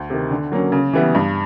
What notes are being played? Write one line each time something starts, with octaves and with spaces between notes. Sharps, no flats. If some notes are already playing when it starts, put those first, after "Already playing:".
Already playing: D2
C3 D#3
D3
F#3 A#3 C#4
C#3
E3 G3 B3 E4
G2